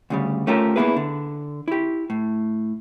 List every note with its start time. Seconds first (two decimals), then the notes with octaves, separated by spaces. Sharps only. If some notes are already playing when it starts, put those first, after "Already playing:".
0.10 D2 C#3 G3
0.47 A3 C#4 F4 G4 A4 A#4
0.76 A#3 B3 D4 E4 G#4 B4
0.96 D3
1.68 E4 G4
2.10 A2